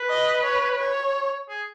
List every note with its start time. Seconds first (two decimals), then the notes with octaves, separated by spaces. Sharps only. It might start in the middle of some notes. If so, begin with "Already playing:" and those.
Already playing: B4
0.09 D#5
0.43 C#5
0.78 C#5
1.49 G#4